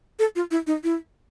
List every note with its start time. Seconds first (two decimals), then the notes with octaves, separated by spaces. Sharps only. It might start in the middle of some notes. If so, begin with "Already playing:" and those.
0.19 A4
0.36 F4
0.51 E4
0.67 D#4
0.84 E4